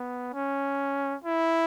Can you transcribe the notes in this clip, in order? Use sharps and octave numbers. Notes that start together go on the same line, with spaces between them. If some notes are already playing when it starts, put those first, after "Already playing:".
Already playing: B3
C#4
E4